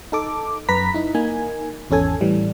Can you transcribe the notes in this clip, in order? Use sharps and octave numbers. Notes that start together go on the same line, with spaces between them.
D#4 A4 D6
F#2 B4 A#5 B6
D#4 E4
A#3 D#4 G#5
G#1 E2 C#4 A4 G#5
A2 E3 G3